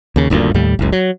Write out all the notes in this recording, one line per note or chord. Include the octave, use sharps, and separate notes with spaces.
D#2 C#3
D#1 D2 G2 A#2
D#2 A2 G3
F#1 C#2
F#3